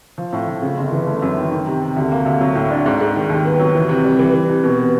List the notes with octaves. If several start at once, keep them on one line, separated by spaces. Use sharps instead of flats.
F3
A2
F3
C#3
G1
E3
A3
F#2
D#3
D#3
C3
C3
D2
A#3
D2
F#3
A2
D4
G#2
G#2
D#3
D#2
B3
F#3
E3
C3
G3
E3
E3
C3
B2
B3